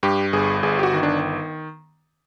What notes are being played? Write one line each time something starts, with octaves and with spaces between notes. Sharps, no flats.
G2 G4
G1 G#4
G1 G#4
G4
F#4
D#3
D4